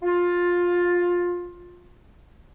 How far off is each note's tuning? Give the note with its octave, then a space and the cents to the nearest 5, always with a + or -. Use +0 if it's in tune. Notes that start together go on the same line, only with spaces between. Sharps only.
F4 +15